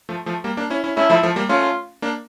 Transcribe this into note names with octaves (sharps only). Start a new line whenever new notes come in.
F3 A3
F3 A3
G3 A#3
A#3 D4
C#4 E4
C#4 E4
A3 C#4 E4
F3 A3
F3 A3
G3 A#3
A3 C#4 F4
A#3 D4